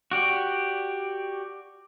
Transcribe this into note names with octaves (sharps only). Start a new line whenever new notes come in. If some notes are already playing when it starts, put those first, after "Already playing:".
F#4 G4 D5